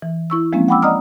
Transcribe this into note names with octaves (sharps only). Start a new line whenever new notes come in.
E3
E4 C#6 E6
F3 G#3 A#3 C4 C#4
F#5 G5 B5 D6 E6
D5 D#5 F#5 A#5 D#6 F6